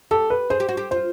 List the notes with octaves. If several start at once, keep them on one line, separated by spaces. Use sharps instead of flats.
G4 A4
B4
G#4 C5
G4
F#4
G4
F4 C5